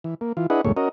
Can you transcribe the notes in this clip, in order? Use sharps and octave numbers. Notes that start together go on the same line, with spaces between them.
E3
A#3
E3 F4
D4 E4 G#4 B4 D#5 F#5
D2 G2 A#2 G#3 A3 C#5
C#4 F#4 A#4 D#5